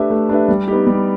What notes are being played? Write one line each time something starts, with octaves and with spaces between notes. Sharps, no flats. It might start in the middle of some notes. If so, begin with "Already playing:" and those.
Already playing: A3 D4 G4 B4 E5
A3
D4 G4 B4 E5
G3
B3 D#4 G4
G3